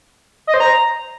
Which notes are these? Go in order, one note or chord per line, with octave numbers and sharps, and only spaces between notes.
D#5
C5
A#5